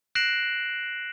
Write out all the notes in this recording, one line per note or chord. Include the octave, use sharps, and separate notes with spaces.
F#6 A#6 C7 D7 E7 F#7